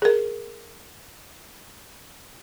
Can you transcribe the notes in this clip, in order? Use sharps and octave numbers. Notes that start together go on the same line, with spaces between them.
G#4 A#4